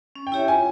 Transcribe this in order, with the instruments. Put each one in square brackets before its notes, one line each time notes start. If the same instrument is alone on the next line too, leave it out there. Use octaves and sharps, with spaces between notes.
[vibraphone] C#4
[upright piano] G5
[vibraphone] E4 G4 C#5 E5
[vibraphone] F4 [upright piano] G#5